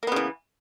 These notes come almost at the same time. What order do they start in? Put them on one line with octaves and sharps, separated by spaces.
A#3 B3 C#3 E3